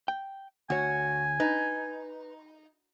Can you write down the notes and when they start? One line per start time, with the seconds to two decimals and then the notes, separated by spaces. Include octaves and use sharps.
0.08 G5
0.70 D2 F#4 C#5 G#5
1.40 D#4 B4